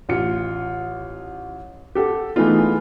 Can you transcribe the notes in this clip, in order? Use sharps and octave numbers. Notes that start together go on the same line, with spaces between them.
A1 F4 C#7
G4 A4 F#5
E3 G#3 A3 B3 D#4 F4